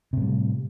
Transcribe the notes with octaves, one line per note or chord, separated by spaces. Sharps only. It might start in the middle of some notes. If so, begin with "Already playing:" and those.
A2 C3 G3